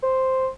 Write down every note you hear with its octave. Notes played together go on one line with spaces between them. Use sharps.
C5